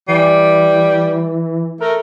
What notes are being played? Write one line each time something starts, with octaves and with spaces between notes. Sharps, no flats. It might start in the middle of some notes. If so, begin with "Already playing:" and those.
E3 G3
A3 A#4